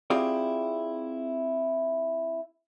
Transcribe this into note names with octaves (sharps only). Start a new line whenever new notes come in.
C4 E4 F4 G4 G#4 D5